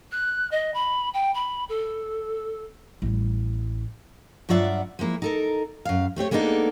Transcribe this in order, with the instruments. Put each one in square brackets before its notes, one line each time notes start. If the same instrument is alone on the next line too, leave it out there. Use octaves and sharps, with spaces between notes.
[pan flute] F#6
D#5
B5
G5
B5
A4
[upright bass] A1 G3
[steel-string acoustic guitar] G2 F#3 F4 D5 E5 F#5
F3 G#3 A#3 E4
D#4 A4 A#4
F#2 F5
A3 C4 G4 C#5
G#3 A#3 B3 D4 D#4 A4